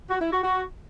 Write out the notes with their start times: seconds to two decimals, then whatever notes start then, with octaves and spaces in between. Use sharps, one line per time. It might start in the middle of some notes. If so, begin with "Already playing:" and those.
0.10 F#4
0.21 E4
0.32 F#4
0.43 F#4